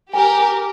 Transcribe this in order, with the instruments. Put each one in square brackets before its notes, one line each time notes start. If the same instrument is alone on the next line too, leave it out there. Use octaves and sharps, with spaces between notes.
[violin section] G4 A#4 [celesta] G#5
[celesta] G#5